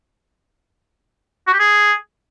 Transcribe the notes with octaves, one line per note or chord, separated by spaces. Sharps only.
F#4
G4
G#4